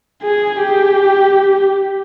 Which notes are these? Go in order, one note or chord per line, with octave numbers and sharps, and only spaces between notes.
G#4
G4